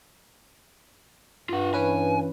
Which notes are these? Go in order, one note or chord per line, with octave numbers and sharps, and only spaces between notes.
G2 F4 F#5
E3 C#4 B4 G#5